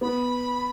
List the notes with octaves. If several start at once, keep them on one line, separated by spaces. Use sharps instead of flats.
B3 B5